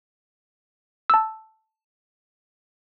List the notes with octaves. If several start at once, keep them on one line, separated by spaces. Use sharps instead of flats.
A5 E6